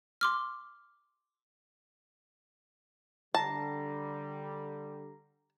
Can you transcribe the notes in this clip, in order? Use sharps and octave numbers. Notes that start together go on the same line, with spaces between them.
C6 D6 F6
D3 G3 A5 A#5 A#6 C7